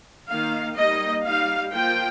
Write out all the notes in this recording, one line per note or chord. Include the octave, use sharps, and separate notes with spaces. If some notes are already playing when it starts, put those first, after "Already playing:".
D#3 A#3 D#4 F5
G3 A#3 D#4 D#5
G3 D#4 F5
F3 A#3 F4 G5